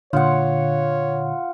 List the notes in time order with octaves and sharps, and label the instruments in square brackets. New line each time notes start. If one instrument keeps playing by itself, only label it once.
[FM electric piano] A#2 D3 [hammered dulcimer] F4 F#5 [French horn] C#5